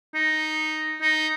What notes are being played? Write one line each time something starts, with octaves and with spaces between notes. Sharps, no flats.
D#4
D#4